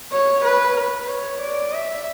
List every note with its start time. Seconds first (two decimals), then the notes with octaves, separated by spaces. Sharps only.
0.12 C#5
0.45 B4
0.77 B4
1.09 C#5
1.41 D5
1.73 E5